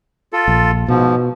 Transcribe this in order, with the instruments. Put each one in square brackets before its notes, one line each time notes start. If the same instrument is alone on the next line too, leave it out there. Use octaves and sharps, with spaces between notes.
[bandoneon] F4 A4
[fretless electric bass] A#1
[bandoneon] G#2 F3 [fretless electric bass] B2